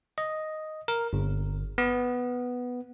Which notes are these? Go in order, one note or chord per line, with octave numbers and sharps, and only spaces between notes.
D#5
A#4
G1
B3